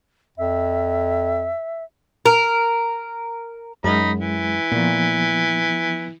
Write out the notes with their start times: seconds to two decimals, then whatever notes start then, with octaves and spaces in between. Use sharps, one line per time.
0.38 F2 E5
2.26 A#4
3.84 F#2 G#3 D#4 B5
4.18 E3
4.72 A#2 F3 B3